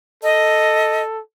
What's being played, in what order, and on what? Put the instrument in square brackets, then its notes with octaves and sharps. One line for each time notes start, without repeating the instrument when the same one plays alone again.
[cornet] A4 [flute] D#5